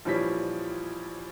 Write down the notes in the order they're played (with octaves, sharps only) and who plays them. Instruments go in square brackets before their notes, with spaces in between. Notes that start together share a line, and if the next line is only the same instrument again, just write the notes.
[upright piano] A#1 E3 F3 G3 C#5 B6